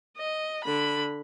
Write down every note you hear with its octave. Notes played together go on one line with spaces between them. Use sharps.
D#5
D3 B5